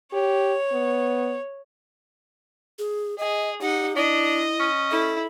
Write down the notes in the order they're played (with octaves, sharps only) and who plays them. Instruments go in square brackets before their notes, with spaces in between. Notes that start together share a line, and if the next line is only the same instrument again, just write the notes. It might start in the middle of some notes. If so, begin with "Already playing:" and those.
[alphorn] G4 [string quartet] C#5
[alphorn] B3
[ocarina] G#4
[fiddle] G#4 [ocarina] D#5
[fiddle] D#4 F#5 [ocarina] G4
[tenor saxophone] D4 [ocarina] E4 [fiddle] D#5
[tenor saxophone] C#4
[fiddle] E4 [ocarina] A4